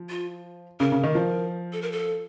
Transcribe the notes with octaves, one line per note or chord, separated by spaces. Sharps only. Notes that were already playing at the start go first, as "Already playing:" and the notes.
Already playing: F3
F4
C#3 A#4
C#3
D#3
F3
A4
A#4
A4